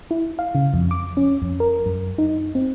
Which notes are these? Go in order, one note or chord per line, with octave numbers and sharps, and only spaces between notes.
E4
F5
C#3
F2
D6
C#4
F2
A#4
F#2
D#4
C4